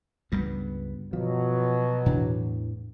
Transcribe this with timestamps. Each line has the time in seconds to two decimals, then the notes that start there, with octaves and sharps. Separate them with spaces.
0.32 C#2 G2 F#3 G3 B3
1.13 B2 F3 F#3
2.06 E2 A2 E3 D4